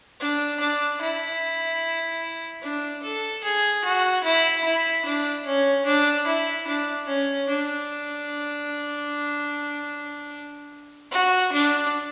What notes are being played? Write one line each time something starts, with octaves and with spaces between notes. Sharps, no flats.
D4
D4
E4
D4
A4
G#4
F#4
E4
E4
D4
C#4
D4
E4
D4
C#4
D4
F#4
D4